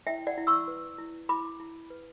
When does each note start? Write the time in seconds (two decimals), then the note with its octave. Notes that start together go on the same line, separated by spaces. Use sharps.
0.07 E4 E5 G5
0.27 D5 F#5
0.37 E4
0.47 C#6 E6
0.68 B4
0.99 E4
1.29 E4 B5 D6
1.60 E4
1.90 B4